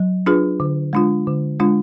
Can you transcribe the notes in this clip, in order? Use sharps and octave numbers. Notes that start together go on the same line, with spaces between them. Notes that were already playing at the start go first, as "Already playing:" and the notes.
Already playing: F#3
D4 F4 G#4 B4
D3
G#3 D4 F4
D3
G#3 D4 F4